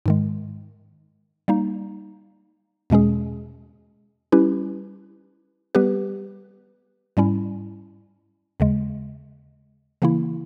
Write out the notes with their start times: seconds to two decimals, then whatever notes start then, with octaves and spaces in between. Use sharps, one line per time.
0.06 G#2 D#3 G#3
1.48 G3 A#3 D#4
2.90 E2 B2 G#3 C#4 G#4
4.32 G3 C#4 E4 G4 B4
5.75 G3 B3 G4 B4
7.17 G#2 G3 C#4 E4
8.60 D#2 C#3 G#3
10.02 C#3 E3 A#3 E4